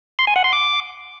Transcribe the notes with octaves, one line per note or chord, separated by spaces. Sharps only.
C6
G#5
F#5
C6
D6